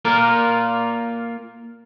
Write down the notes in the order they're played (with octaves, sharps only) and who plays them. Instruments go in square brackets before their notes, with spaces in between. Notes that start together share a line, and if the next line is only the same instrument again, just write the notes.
[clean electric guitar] A#3 F4 A#4